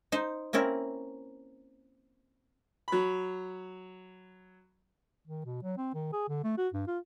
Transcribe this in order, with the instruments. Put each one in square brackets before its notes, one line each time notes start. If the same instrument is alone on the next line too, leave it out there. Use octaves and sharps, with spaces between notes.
[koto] D#4 C5
A#3 C4 C#4 E4 A#4
[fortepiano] F#3 B5
[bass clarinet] D#3
B2
F#3
C4
D#3
G#4
D3
A3
F#4
G2
F4